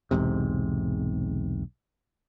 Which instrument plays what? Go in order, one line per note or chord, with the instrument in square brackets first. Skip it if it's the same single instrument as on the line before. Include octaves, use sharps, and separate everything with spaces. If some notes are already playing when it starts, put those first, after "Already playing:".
[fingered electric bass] B1 E2 G#2 C3